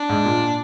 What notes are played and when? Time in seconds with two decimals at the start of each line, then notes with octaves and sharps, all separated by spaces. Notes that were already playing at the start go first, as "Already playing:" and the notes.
Already playing: D4
0.09 G#2
0.25 A#2